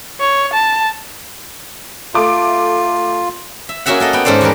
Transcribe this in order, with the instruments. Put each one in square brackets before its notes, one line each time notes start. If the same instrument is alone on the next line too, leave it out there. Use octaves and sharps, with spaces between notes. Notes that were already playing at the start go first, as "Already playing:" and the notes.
[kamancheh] C#5
A5
[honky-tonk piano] A3 D6 [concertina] F4
[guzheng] E5
A#3 C#4 F#4 G#4 E5 F#5
A#3 A4 D#5
B3 G5
G#2 C#4 A4 C5 D5
E2 E3 G3 A#4